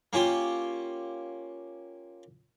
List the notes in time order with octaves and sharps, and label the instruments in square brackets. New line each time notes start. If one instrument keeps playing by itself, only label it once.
[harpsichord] A#3 C#4 F4 G4